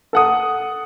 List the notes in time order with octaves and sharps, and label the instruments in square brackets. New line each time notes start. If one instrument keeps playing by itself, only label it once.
[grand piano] A4 F#5 D#6